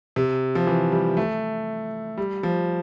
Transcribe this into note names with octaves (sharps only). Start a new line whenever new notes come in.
C3
F3
E3
G3
A3
G3
F3